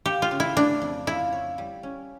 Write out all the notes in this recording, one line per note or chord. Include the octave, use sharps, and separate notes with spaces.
A#3 G4
F4
C#3
E4
A3 D4
F2
E4 F4
C#5
G3
C#4